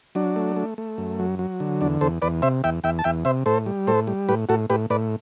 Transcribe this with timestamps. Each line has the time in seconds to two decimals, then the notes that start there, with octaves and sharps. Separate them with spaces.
0.15 F#3 D4
0.36 A3
0.56 A3
0.78 A3
0.98 F#2
1.19 F#3
1.39 F#3
1.60 D3
1.81 E2 D4
2.01 E2 A4 C5
2.22 E2 B4 D5
2.42 C3 C5 E5
2.64 E2 E5 G5
2.84 E2 E5 G5
2.99 A5
3.04 E2 E5 G5
3.25 C3 C5 E5
3.46 A2 A4 C5
3.66 G3
3.87 A2 A4 C5
4.07 G3
4.29 A2 G4 B4
4.49 A2 F#4 A4
4.70 A2 G4 B4
4.90 A2 B4 D5